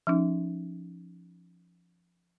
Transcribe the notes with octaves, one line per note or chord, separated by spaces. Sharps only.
F3 C#4 D#4